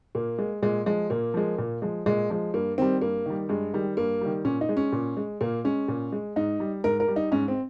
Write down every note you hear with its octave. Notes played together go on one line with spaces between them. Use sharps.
A#2 A#3
G#3
A#2 G#3
F3 G#3
A#2 A#3
F3 G#3
A#2
F3 G#3
A#2 G#3
F3 G#3
G2 A#3
D#3 G3 C4
G2 A#3
D#3 G3
G2 G#3
D#3 G3
G2 A#3
D#3 G3
A#2 C#4
D#4
G#3
C#4
A#2
G#3
A#2 A#3
G#3 C#4
A#2
G#3
G#2 D#4
G3
G#2 A#4
A#4
G3
D#4
G#2 C#4
C4